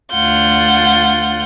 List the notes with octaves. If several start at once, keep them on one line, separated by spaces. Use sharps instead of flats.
D2 F4 F#5 G6